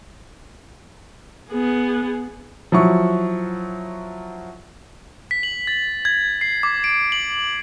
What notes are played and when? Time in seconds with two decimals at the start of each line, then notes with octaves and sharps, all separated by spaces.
1.49 B3 G#4
2.72 F3 F#3 E4 C#6
5.31 B6
5.43 F#7
5.67 A6
6.05 G#6
6.41 C7
6.63 D6
6.84 D7
7.12 F#7